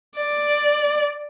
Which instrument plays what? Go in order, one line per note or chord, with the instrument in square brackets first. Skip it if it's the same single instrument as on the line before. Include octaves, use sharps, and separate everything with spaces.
[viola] D5